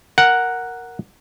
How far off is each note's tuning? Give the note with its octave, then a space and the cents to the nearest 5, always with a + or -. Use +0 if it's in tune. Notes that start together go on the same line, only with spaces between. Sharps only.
A#4 +0 F#5 +0